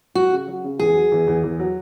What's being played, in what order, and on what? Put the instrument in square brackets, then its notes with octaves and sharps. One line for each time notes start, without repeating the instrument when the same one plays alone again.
[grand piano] F#3 [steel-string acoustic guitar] F#4
[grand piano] C#3
F#3
C#3
[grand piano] E2 [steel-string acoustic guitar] G#4
[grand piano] F#3
E2
E2
E2
F#3